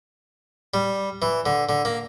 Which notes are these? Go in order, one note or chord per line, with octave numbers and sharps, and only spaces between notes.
G3
E3
D3
D3
A#3